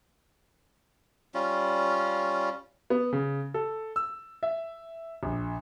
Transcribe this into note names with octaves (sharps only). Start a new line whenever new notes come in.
G3 C#4 F4
B3
C#3
A4
E6
E5
A#1